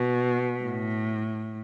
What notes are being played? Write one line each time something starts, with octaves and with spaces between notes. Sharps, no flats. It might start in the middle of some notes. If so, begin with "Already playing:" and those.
Already playing: B2
A2